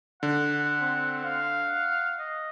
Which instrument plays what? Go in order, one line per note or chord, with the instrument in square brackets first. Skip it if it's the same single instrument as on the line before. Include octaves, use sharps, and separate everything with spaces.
[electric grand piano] D3 [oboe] F#5
[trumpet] C4
F5
[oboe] F#5
D#5